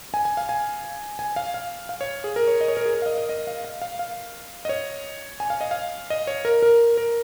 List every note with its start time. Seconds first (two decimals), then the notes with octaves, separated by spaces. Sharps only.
0.14 G#5
0.25 G#5
0.37 F5
0.49 G#5
1.19 G#5
1.36 F5
1.54 F5
1.89 F5
2.01 C#5
2.24 G#4
2.36 A#4
2.48 C#5
2.61 D#5
2.68 C#5
2.77 A#4
2.86 G#4
2.94 A#4
3.02 F5
3.06 D#5
3.18 D#5
3.29 D#5
3.47 F5
3.65 F5
3.82 F5
3.99 F5
4.65 D#5
4.69 C#5
5.40 G#5
5.50 F5
5.61 D#5
5.71 F5
6.10 D#5
6.27 C#5
6.45 A#4
6.62 A#4
6.97 A#4